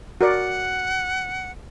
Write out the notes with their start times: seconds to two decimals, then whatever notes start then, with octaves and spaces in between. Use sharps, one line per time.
0.21 F#4 A#4 D5 F#5